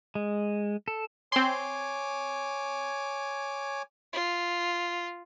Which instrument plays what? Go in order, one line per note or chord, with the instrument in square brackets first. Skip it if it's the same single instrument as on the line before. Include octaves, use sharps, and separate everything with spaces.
[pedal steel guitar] G#3
A4
[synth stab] C4 C6 [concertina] C#5 G#5 D6
[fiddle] F4